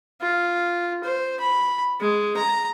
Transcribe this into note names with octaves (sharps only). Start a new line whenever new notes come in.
F4
C5
B5
G#3
A#5